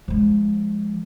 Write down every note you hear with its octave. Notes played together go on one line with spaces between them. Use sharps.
F3 G#3